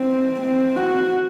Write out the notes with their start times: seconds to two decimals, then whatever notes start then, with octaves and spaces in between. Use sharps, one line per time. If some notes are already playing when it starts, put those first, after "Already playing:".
Already playing: C4
0.41 C4
0.76 F#4